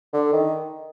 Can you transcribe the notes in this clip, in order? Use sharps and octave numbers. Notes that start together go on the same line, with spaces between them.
D3
D#3